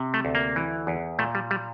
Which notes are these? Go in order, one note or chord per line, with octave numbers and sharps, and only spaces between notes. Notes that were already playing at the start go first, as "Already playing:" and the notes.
Already playing: C3
A3
D2
A#3
E3
E2
A#2 A3
G3
G3